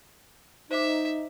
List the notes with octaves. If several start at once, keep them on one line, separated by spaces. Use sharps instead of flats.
D#4 C5 E5 D6